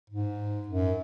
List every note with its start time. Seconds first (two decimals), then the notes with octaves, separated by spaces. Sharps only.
0.10 G#2
0.68 F#2